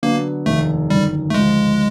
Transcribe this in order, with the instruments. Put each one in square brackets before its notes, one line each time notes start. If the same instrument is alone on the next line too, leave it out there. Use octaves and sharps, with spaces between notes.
[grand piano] D3 F#3 B3 D4 [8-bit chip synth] A#3
[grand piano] F1 D#2 D#3 [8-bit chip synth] A3
[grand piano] G1 F#2 D#3 [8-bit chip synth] G3
[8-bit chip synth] A3
[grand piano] D2 C#3 F3 [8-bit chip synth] G#3